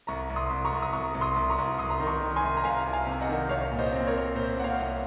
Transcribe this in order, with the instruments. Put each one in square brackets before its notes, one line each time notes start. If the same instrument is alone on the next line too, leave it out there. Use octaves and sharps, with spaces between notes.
[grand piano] C2 A#5 C#6
C2
C6 D#6
C2
A#5 C#6
C2
D#6
C2 A#5 C#6
C2
C6 D#6
C2
A#5 C#6
C2
C2 C6 D#6
A#5
D#3 C6
A#5 C#6
D#3
G#5 C6
C2
A#5
C2 F5 G#5
C2
F5 G#5
C3
D#5 F#5
D#3
C2 C#5 F5
A#2
C5 D#5
C4
A#4 C#5
C4
A#2 C5
C4 F#5
C#5 F5
C2